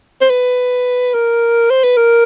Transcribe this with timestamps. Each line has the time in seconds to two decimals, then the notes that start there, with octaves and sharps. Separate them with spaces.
0.21 C5
0.30 B4
1.14 A#4
1.70 C5
1.84 B4
1.97 A#4